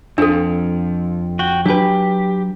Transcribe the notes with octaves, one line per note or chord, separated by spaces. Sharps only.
F2 F3 D4 A4
F#4 G5
F#3 D4 G4 B4 G#5